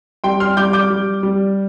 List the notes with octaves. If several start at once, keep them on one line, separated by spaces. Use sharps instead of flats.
G3 G5 C6
C6 F6
G3 D6 G6
D6 G6
G3
G3